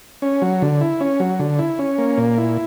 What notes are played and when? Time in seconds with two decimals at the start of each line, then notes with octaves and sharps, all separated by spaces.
0.22 C#4
0.42 F#3
0.62 D3
0.81 E4
1.00 C#4
1.20 F#3
1.39 D3
1.59 E4
1.79 C#4
1.98 A#3
2.18 A#2
2.38 E4